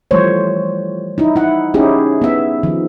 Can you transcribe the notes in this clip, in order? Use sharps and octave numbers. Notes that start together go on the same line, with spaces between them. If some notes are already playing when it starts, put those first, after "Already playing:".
E3 F3 G3 A3 C5 C#5
D#4 E4
E4 F#5
C#4 D#4 E4 G4 G#4
B3 E5
D#3 F3